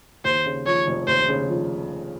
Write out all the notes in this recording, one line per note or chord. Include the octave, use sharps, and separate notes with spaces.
D#2 C5
C#3
F3 C#5
F1
D#2 C5
C#3
F3